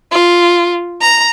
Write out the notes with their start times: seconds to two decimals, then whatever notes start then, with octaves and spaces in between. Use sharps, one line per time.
0.12 F4
1.01 A#5